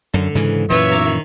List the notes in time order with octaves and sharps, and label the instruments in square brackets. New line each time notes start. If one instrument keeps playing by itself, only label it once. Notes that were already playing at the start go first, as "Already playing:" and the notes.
[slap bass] F#2 [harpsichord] D3
[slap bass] G#2 C#3 E3
[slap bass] F#2 A#2 E3 [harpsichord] B3 B4 [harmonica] C#5 E5
[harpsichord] B1 A#5 D6
D#3